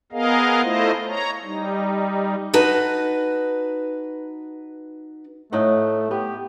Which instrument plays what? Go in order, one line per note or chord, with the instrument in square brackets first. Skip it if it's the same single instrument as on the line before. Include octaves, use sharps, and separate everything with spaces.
[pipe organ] B3 G#4 A#4 D#5 F5
A3 E4 F4 C5 D#5
C#5 A#5
G3 D#4
[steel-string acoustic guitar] D#4 F#4 B4 A5
[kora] A2 D#4 F#5 [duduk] A3
[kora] B3 [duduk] G4